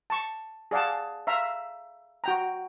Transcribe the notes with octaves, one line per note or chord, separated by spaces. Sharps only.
A5 C#6
G#4 D5 F5 F#5 A5
E5 F5 A#5
F#4 G5 A#5